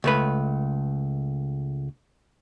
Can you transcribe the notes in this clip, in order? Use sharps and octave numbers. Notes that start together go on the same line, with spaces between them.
C#2 A3 B4